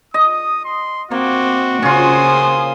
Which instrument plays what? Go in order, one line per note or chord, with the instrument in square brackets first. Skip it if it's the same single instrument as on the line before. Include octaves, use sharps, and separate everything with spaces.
[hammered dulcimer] D#5 [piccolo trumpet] D#6
[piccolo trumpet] C6
[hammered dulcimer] A#3 [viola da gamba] C4 [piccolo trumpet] F#4
[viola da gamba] C#3 C5 [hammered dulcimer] C#4 F4 [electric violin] G#5 D#6